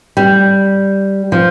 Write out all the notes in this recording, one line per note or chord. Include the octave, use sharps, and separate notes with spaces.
G3
F3